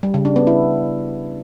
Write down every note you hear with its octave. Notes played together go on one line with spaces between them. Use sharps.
G3
C#3
D4
B3
E4